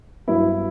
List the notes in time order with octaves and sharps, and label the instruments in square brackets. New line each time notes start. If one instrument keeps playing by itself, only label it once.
[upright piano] G2 F#3 B3 E4